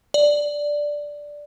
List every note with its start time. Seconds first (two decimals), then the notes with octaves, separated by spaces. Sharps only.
0.14 D5